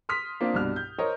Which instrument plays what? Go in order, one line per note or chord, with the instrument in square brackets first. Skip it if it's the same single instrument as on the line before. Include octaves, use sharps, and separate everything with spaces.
[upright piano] C6 D#6 F6 B6
A#3 C4 D4 F4
C2 G2 B2 D4 F6
G6
A#4 C5 C#5 D#5